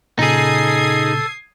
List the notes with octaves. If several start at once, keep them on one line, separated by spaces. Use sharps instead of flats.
A#2 C#3 D#4 G#4 A4 D#6 G#6 C7